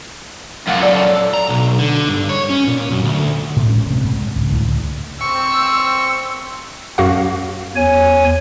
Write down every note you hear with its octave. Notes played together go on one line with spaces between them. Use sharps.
F#2 A#2 F4 F#5
A4 D5
A#5
B1
D3
G2
C#5
C#4
A#2
F#2
D2
A2
A1 G#3 A3 C#4
G2 C3
G#2
C#2
D2 A2 D3
C4 C#6 E6
F#2 F#4 F5
E2 C#5 G#5